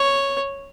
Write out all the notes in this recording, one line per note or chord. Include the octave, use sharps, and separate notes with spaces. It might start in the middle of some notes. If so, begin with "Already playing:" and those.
Already playing: C#5